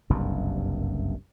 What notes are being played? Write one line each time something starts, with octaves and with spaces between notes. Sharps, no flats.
F#1 C2 G2